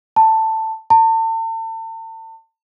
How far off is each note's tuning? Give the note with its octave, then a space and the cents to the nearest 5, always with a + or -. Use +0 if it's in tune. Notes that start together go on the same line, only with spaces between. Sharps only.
A5 +10
A5 +40